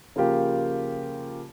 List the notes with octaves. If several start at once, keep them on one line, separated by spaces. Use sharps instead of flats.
C#3 F3 A#3 F4 G4 A#4